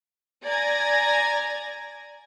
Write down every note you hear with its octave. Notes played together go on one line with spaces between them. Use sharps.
D5 G#5 A#5 G#6 A#6